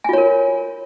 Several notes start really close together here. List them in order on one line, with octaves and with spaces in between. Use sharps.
G#5 F4 C#5 A#4